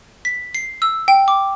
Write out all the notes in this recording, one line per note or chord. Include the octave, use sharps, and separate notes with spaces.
B6
C7
E6
G5
D6